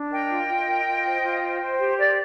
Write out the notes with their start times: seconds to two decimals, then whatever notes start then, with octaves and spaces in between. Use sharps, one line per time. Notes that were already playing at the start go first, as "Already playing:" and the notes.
Already playing: D4
0.11 A#4 D#5 G5
0.31 F4
0.49 F4
0.67 A#4
0.86 F4
1.05 C5
1.24 F4
1.42 C5
1.61 C5
1.79 G4
1.98 A#4 D5